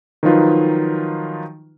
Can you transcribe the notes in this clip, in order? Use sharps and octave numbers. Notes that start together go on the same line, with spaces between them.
D#3 F3 F#3 D#4 F4 B4